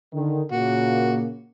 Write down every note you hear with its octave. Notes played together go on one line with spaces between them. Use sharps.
D3 D#3
A#2 C#3 A#3 F#4